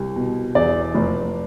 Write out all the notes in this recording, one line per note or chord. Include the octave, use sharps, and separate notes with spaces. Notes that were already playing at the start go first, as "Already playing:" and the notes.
Already playing: C2
B2
E2 D5
F1